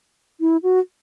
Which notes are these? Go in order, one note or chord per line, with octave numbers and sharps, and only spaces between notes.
E4
F#4